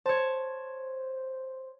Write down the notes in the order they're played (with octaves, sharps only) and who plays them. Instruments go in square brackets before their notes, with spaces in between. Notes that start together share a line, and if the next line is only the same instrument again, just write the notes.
[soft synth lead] C5 [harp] C#5 A5